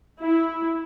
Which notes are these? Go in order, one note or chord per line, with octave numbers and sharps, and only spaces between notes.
E4